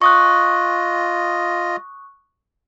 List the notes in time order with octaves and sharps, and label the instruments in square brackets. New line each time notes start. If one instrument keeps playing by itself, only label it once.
[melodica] F4 D#5 [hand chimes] C#6 D#6 F#6